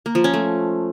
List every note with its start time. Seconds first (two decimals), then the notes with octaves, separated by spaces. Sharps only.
0.06 A#3
0.15 F3
0.24 C#4
0.33 A3